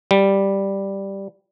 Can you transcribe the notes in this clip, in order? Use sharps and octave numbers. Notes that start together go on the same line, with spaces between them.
G3